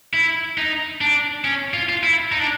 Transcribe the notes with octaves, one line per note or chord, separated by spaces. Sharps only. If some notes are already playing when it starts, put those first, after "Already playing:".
E4
D#4
D4
C#4
F4
F4
E4
D#4
D4